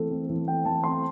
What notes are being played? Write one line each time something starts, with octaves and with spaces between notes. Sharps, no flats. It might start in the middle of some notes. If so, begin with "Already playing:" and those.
Already playing: E3 A3 C4 A4
A3 C4
E3
A3 C4 G5
E3 A5
A3 C4 C6